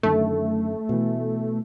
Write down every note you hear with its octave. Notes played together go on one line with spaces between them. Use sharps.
F#2 D3 D#3 A3
B2 E3